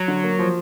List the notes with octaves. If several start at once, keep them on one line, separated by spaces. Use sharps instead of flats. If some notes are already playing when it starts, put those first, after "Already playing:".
Already playing: F#3
D3
A#3
F3